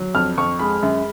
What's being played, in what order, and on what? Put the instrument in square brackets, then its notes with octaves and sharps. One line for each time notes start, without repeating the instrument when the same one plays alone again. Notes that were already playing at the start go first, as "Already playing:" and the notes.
Already playing: [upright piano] F#3
F2 F6
F2 C#6
G#3 B5
F#2